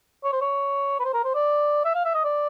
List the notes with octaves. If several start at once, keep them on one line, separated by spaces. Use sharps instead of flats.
C#5
C5
C#5
B4
C5
A#4
C5
D5
E5
F5
E5
D#5
D5